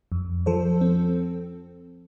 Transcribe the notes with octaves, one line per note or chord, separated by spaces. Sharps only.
F2
F3 A4 C5
C4